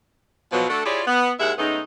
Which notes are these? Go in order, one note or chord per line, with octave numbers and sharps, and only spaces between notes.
B2 F3 F#3
A3 D4 F#4 A4
E4 F4 G4 G#4 C#5 D5
B3
D#2 G#3 E4 E5 F#5
C#3 G#3 A3 B3 D#4